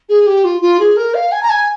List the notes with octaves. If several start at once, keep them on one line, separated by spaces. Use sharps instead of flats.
G#4
G4
F4
F4
G#4
A#4
F5
G#5
A#5
G#5